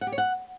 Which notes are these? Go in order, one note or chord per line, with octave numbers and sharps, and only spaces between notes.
F#5
G4
C#5
F#5